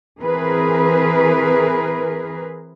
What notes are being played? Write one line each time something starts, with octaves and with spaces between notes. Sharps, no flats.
E3 C4 G#4 A#4 B4